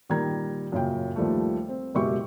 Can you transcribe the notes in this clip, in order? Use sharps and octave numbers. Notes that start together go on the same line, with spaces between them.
A#2 D#3 G3 A#4 A#5 G#6
F#2 A#2 C#3 G5
D#2 F3 G3 A3
C4
F#1 B2 G#3 G4 E5 C#6